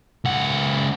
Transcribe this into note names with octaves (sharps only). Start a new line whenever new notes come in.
C#2 F#5